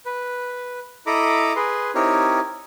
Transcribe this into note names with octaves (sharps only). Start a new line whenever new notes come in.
B4
E4 A4 D#5 A#5 B5 D6
G#4 B4 C6
C4 D#4 E4 G4 A#4 C#5